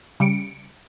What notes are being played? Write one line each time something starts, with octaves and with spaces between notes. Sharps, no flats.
C#3 G3 C#7 D7